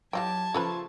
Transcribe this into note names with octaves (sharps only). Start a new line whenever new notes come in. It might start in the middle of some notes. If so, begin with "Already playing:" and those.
E3 F#3 F4 G4 D#5 G5 A5 G#6
C#3 F3 A3 F4 A4 B4 B5